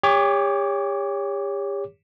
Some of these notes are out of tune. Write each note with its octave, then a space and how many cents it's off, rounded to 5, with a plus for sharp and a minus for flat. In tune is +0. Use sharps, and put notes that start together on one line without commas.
G4 +40 C#5 +15 D6 -10